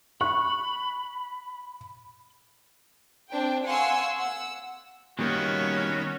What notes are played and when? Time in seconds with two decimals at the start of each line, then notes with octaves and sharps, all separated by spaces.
0.21 B5 C#6 F#6
3.31 C4 D4 G5
3.65 F5 F#5 G#5 C6 C#6 E6
4.17 F#5 E6
5.19 A#2 D#3 G3 A#3 B3 C#4 F#4